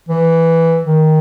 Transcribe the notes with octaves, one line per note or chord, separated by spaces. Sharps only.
E3
D#3